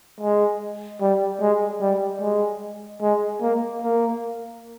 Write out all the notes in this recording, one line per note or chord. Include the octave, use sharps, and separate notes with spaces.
G#3
G3
G#3
G3
G#3
G#3
A#3
A#3